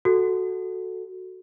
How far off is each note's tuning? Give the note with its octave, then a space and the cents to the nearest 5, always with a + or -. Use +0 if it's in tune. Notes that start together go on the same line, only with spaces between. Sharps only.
F#4 +0 A4 +0